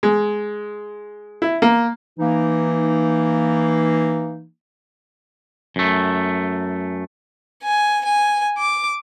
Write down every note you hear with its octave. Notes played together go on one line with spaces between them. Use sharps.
G#3
E4
A#3
E3 A#3 D#4
F#2 A3
G#5
G#5
D6